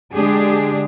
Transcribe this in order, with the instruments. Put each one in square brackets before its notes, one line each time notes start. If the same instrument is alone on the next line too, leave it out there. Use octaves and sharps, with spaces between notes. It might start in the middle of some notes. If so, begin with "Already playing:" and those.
[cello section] D3 G#3 D4 G4 G#4